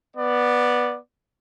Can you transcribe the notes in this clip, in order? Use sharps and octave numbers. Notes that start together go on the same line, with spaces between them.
B3 D5